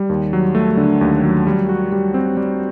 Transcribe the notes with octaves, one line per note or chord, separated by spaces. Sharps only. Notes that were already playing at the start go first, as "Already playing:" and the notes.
Already playing: G3
D#2
F#3
A3
D3
D#2
F#3
G3
F#4
G3
C4
G3